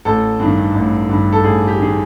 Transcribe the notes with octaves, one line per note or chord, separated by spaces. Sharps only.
A1 A4
G2 D#3
A1
G2 D#3
A4
A1 G#4
G4
D#3 G#4